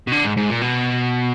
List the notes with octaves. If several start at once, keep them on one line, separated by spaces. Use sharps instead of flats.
B2
D3
G#2
G#2
A#2
B2